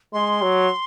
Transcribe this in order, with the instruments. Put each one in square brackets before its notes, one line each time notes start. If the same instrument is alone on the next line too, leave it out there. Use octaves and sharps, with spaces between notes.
[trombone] G#3 [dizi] C6
[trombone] F#3